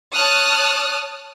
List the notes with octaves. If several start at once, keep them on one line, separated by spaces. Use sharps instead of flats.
C#5 A5 D#6 F6 F#6